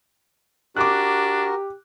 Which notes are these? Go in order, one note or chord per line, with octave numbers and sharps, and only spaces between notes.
D4 F#4 G4 A#4 D6 F#6